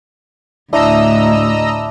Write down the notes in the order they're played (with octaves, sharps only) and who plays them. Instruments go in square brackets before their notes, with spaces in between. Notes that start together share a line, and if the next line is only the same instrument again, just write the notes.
[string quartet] D2 A2 [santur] D4 E4 [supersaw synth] D#5 A#5 E6